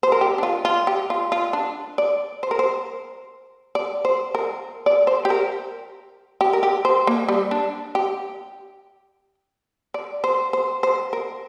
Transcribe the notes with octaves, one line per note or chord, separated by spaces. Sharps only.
C5
A#4
G4
D4
F4
F4
G4
F4
F4
D4
D5
C5
A#4
C5
D5
C5
A#4
D5
C5
G4
A#4
G4
A#4
G4
C5
A#3
G3
D4
G4
D5
C5
C5
C5
A#4